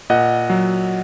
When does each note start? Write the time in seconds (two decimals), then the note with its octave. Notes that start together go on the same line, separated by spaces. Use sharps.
0.10 A#2 D#5 F#5
0.50 F#3